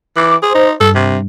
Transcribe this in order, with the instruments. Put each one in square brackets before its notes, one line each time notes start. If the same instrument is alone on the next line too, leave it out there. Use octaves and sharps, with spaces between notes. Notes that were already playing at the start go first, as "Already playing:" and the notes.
[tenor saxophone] E3 [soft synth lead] D6
[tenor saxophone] G#4 [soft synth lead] C5
[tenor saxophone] D#4
[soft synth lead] G2 [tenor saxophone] A4
[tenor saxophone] C3